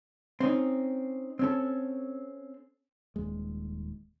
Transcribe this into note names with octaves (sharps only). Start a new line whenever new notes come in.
C4 C#4 D#4
C4 C#4 A4
D#1 G#3